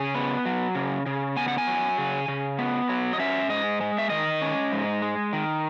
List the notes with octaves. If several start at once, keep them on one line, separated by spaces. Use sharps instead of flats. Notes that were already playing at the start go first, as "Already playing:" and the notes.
Already playing: C#3 G#5
B3
F#3
C#3
C#3
B3 G#5
F#5
G#5
F#3
C#3
C#3
B3
F#3
D#5
C#4 E5
G#2 D#5
G#3
E5
D#3 D#5
C#4
G#2
G#3
D#3